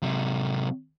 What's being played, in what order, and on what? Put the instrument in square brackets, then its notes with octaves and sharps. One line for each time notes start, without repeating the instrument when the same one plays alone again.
[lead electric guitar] C3 F#3